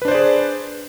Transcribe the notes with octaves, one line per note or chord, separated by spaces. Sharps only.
D4 G#4 B4 C5 D5